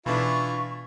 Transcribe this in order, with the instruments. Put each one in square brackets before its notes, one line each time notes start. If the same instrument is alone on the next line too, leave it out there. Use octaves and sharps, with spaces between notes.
[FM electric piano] B2 [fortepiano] E3 D4 [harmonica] E4 F4 [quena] C#6